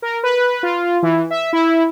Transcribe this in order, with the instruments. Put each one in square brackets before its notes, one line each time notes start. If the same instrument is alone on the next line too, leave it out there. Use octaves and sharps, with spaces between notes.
[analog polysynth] A#4
B4
F4
E3
E5
E4